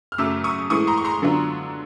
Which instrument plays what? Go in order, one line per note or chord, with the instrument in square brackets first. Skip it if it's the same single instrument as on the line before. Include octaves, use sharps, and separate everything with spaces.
[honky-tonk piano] F6
F#2 C#3 F#3 A3 D6 E6
C#6 D#6
A2 E3 G#3 C#6 D#6
A#5 C6
C#6
A#5 C6
D3 F#3 B3 D4 F4